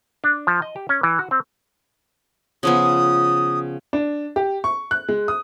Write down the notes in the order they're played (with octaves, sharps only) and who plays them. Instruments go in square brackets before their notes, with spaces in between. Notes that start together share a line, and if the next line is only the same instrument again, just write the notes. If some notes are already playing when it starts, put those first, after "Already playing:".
[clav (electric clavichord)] D4
F3
D#5
G4
C#4
E3
F#4
C4
[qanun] C#3 F3 B3 [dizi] D#6
[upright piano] D4
G4
C#6
F#6
G#3
D#6